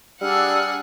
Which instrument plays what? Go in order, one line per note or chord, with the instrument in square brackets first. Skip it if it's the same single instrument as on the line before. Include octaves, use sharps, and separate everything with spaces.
[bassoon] G3 [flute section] D4 E6 F6 [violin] G#4 F#5